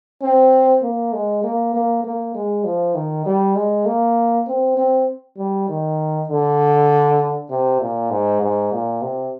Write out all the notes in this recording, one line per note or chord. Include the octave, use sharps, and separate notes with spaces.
C4
A#3
G#3
A#3
A#3
A#3
G#3
F3
D#3
G3
G#3
A#3
C4
C4
G3
D#3
D3
C3
A#2
G#2
G#2
A#2
C3